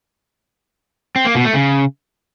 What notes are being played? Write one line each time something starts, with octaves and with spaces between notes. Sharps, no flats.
C4
A#3
B2
A3
C#3